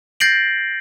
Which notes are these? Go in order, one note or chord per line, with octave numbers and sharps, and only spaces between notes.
G6 A6 A#6 C7 D7 F#7